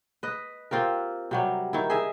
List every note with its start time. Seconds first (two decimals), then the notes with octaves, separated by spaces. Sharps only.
0.23 B4 D#5
0.71 C4 F4 G4 A#4
1.31 C3 F#3 G3
1.73 D#3 E4
1.90 G#4 D#5 E5